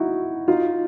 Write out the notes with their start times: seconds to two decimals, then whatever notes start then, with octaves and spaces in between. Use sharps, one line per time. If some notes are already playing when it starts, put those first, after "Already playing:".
Already playing: D#4 E4 F#4
0.48 D#4 F4